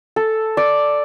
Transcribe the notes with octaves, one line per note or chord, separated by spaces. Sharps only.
A4
D5